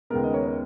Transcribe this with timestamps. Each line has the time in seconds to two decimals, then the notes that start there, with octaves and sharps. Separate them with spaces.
0.10 D#2 C#3 G#3 B3 A#4
0.24 D#5
0.34 A#4 C#5
0.47 C#5